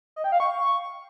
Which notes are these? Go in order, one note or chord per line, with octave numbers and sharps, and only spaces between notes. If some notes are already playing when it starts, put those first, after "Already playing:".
D#5
G5
F5
C#6